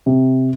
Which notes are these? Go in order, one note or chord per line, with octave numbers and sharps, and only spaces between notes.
C3